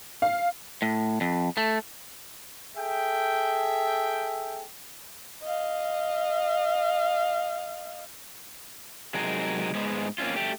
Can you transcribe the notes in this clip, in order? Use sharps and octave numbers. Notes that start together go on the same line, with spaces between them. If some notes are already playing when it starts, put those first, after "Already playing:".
F5
A2
F2
A3
G#4 A4 E5 G5
D#5 F5
C3 F#3 G#3 D#4 G#4 A#4
G#2 G#3 B3
A#3 C4 C#4 F4
A3 G4